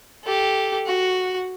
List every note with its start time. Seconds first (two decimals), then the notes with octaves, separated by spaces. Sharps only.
0.24 G4 A4
0.86 F#4